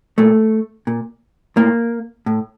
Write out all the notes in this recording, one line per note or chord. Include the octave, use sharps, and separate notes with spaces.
A#2 A3
A#2
A2 A#3
A2